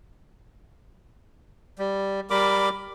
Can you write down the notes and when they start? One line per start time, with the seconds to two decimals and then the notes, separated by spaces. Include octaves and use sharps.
1.78 G3
2.30 G3 A#4 B5 D6